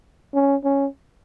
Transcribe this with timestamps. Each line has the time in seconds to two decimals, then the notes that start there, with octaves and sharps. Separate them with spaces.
0.34 C#4
0.64 C#4